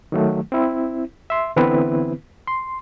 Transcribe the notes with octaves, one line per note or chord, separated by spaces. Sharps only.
D#3 F#3 A3
C4 E4
E5 C6
D3 E3 B3 C4 E4 B4
C6